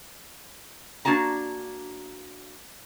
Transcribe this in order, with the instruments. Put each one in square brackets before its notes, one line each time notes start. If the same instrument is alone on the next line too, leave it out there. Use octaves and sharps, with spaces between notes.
[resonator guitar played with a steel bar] A#3 D4 F#4 A5 A#5